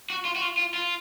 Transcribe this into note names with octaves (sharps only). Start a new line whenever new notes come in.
F#4
F4
F#4
F4
F4
F4